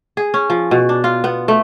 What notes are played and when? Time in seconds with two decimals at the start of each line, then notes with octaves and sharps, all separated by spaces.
0.17 G#4
0.34 C#4
0.50 F3
0.71 B2
0.89 D4
1.04 F4
1.24 B3
1.48 A3